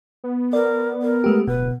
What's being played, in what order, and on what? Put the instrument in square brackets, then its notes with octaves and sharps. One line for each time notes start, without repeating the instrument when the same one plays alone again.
[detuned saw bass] B3
[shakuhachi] A#4 [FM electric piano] D5
[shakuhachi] A#4
[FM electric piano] G#3 A3 G4
[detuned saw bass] D1 [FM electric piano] B2 [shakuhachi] B4